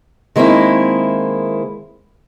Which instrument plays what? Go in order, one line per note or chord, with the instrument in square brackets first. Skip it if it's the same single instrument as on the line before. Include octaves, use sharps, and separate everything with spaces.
[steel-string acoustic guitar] D#3 G#3 A#3 C4 E4